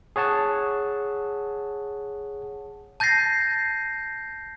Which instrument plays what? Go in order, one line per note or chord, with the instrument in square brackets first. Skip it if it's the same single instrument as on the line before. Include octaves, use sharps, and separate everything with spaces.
[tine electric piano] G#4 C#5 F#5 A5
[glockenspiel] A5 G6 A6 A#6 C7